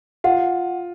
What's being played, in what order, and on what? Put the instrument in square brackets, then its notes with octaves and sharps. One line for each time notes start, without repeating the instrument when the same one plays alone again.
[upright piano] F4 [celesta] F#5